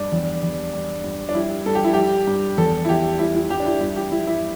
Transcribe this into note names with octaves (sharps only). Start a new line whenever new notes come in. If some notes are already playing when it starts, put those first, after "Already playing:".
Already playing: G2 D4
E2
E2
G2
G2
D4
G3 E4
G2 A4
G4
E4
G3 G4
G2
E2 A4
E4
E2 G4
G3 E4
E4
G2 G4
D4
E4
G2 E4
G4
G2 E4
E4